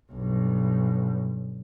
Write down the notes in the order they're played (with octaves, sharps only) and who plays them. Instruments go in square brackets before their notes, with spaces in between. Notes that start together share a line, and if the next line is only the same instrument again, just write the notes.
[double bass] B1 G2